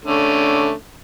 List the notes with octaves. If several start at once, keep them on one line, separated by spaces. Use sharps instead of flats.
D3 A3 C#4